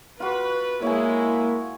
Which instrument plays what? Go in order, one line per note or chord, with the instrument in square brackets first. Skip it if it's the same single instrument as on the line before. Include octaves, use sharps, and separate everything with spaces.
[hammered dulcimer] F4 F#4 [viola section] B4
[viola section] G#3 E4 [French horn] A#3 [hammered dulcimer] C#5 G#5